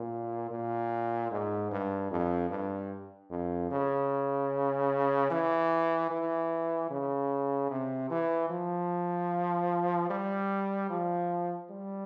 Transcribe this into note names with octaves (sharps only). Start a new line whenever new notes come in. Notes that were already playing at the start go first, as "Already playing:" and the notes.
Already playing: A#2
A#2
G#2
G2
F2
G2
F2
C#3
E3
E3
C#3
C3
E3
F3
G3
F3
G3